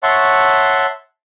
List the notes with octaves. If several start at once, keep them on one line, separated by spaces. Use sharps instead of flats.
C#5 E5 F#5 A5 C6 C#6